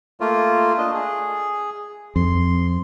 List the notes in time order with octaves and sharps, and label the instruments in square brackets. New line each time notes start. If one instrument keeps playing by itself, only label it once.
[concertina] A3 A#3 F4
D4 D#5
G#4
[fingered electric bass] F2 [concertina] C6